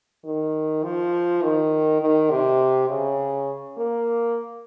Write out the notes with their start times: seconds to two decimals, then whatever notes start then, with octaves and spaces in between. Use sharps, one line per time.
0.24 D#3
0.83 F3
1.42 D#3
2.01 D#3
2.31 C3
2.89 C#3
3.77 A#3